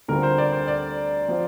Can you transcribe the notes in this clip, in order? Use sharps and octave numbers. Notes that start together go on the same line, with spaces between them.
D2 D3 G3 C4 F4 A#4
C5
D5
C5
D5
F3 C4 F4